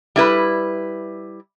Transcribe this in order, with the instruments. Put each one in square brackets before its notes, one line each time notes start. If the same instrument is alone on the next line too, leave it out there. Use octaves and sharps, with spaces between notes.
[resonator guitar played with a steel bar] G3 E4 B4